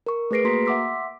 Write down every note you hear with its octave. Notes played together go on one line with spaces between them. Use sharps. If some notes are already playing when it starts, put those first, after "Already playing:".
A#4 C#6
A3 G#4 B4 A#6 C7 D7
A#3 F#4 A#5 C6 B6
E5 F#5 C6 D6 E6 B6